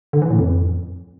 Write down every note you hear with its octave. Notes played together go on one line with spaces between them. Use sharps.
D3
E3
A2
F2